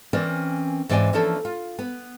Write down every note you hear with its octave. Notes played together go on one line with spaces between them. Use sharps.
E3 C4 C#4 A#4 D5
G#2 E3 C4 D5 D#5 G#5
E3 F3 A#3 C#4 D4 A4
F4
B3